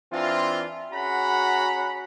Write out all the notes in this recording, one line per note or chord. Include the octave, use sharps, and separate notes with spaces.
E3 C4 D4 F4
C#4 F#4 G#4 F#5 A#5 B5